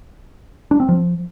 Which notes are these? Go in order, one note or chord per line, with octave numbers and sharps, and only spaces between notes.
D4
C4
F3